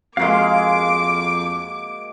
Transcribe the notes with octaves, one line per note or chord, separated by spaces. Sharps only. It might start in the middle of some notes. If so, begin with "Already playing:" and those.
F2 G#3 A#3 F#4 F5 C6 D6